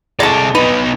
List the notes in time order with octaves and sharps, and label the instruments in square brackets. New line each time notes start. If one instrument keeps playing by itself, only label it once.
[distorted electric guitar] C3 D5 [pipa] G#3 A3 A5
[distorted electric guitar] B2 D#4 [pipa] B4